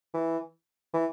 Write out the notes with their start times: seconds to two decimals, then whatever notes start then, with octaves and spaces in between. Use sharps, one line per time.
0.14 E3
0.93 E3